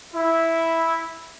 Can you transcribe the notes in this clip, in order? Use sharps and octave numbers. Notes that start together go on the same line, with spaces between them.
E4